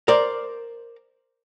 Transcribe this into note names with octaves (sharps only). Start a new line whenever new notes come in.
A#4 C5 D5